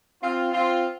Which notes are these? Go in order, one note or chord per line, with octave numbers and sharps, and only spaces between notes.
C4 F4
C4 F4